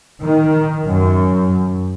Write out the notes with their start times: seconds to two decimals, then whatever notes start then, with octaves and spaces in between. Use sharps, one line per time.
0.21 D#3
0.84 F#2